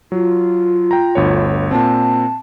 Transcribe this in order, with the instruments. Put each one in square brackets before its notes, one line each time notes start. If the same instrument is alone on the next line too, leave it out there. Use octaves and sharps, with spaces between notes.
[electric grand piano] F#3 [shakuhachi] F4
[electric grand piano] G5 A#5
G1 D2 C#5
[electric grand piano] A#2 C4 [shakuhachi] A5